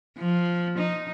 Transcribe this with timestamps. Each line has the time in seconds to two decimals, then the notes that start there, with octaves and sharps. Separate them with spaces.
0.18 F3
0.78 D#4